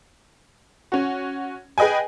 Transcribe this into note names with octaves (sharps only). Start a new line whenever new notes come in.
C#4 F#4
G#4 B4 D#5 G5 G#5